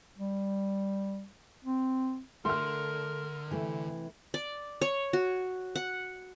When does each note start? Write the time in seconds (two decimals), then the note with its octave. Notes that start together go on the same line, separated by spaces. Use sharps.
0.18 G3
1.65 C4
2.45 D3 A3 A#4 C6 F6
3.50 C3 E3 A3
4.34 D5
4.81 C#5
5.13 F#4
5.75 F#5